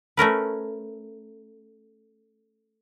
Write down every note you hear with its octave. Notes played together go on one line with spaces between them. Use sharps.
A3 C#4 A#4 B4